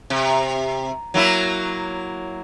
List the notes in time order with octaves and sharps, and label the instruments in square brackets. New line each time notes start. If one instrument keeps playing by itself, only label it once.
[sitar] C3
F#3 A#3 E4